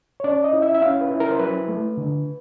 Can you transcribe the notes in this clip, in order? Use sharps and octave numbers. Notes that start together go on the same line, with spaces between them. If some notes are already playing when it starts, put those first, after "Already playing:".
C#5
C#4 D5
D#5
E4
E5
E5
C#4 F5
B4
E4
A#4
C5
F#3 B4
A3
D3